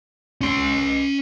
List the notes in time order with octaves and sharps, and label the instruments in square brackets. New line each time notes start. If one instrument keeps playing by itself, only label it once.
[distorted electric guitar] C#4 C6